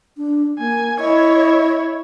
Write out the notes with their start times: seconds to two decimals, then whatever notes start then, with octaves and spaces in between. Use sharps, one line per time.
0.17 D4
0.59 A#3 G#5
1.00 E4 C#5 D#5